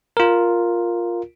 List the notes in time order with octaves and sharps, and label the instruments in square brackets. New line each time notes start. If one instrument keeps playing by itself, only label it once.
[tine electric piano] F4 A#4